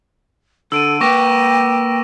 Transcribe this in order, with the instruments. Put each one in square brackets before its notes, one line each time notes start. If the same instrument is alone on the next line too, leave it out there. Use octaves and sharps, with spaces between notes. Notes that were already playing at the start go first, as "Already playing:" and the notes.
[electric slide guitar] D3 [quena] A4 [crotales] E6 D7 D#7
[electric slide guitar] A#3 B4 [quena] G5 [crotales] C#6 D6 A#6